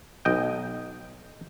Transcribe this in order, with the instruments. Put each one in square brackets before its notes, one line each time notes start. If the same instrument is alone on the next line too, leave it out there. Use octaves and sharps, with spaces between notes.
[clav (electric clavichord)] B1 D#5 G5